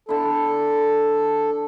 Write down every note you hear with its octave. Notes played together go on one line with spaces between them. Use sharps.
D3 E4 A4